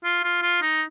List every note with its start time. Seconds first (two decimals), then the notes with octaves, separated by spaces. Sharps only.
0.04 F4
0.24 F4
0.42 F4
0.62 D#4